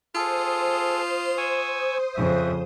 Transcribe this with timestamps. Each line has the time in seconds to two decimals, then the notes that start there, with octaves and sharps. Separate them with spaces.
0.15 F4 G#4 A4 C5 D#6
1.38 G#5 C#6 E6
2.15 F2 C#3 E5